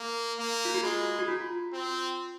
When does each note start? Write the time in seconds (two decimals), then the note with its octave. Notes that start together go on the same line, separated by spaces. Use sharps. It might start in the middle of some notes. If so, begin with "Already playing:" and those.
Already playing: A#3
0.39 A#3
0.65 F4
0.74 F#4
0.83 G#3 G#4
1.19 F#4
1.28 F4
1.73 C4